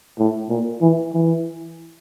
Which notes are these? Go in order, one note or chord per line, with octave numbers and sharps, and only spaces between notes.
A2
A#2
E3
E3